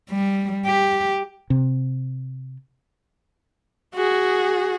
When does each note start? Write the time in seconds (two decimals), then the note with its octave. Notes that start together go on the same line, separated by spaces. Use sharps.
0.11 G3
0.66 G4
1.50 C3
3.94 F#4 G#4